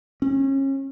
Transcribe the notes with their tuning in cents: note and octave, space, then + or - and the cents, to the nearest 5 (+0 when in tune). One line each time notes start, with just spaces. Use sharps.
C#4 -30